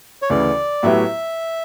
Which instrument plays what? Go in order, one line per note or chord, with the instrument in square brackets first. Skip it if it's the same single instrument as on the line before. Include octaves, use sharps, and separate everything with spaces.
[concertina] C#5
[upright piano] D2 C#3 E3 [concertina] D5
[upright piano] A2 F#3 B3 E4 G4 [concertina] E5